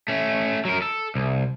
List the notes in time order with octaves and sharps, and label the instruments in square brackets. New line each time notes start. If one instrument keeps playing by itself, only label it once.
[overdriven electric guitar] A3 C#4
F#3 A#4
A4
C2